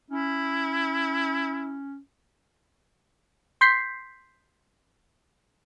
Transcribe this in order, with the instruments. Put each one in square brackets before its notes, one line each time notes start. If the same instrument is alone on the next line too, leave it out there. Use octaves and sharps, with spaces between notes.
[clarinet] C#4 [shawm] E4
[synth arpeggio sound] C6 G6 B6 C7